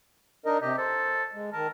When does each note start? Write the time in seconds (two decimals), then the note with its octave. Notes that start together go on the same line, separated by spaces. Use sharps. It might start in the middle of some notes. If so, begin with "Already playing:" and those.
0.46 D4 D#4 A#4 D#5
0.61 C3 G4 D#5
0.78 A4 C5
1.33 G#3
1.53 D#3 A#4 A5